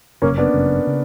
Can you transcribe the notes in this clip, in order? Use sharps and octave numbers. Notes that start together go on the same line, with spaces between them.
G1 F#2 C#3 A#3 C#4
B3 D4
G1 F#2 C#3
C#3